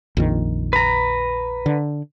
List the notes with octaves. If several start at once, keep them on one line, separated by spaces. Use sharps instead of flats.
A#1 F2 D#3
B4 A#5
D3